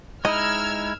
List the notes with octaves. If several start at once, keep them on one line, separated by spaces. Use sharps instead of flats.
G#3 D#4 E4 D#5 E6 F6 G#6